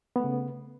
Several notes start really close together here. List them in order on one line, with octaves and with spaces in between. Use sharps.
B3 A3 C#3